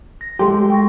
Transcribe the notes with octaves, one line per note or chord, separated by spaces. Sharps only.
A#6
G#3 A3 G4 C6
G5 C#6 A#6